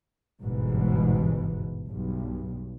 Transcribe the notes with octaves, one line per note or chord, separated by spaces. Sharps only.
G1 C#2 G#2 B2 E3
B1 G2